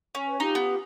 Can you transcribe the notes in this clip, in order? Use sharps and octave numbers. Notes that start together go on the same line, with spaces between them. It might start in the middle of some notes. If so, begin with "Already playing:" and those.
C#4
B4 C#5
D#4 F4 G4
B3